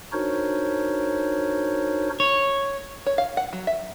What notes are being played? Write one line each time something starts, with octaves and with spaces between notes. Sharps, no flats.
D4 D#4 F#4 A#4 C5 C#5
C#5
C#5
F5
F#5
F#3
E5